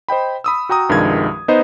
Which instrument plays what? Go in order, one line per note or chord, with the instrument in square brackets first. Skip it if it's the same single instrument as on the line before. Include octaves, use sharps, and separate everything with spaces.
[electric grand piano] C5 D#5 G5 B5
B5 D#6 E6
F#4 G5 A#5 D#6
C2 G2 D#3 F3 G#3 G#6
B3 D#4 B4 C5 D#5